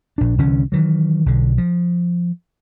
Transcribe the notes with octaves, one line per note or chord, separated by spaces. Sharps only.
A#1 D4
C2 D3 E3 C#4
D#3 E3 F#3
B1 D3
F3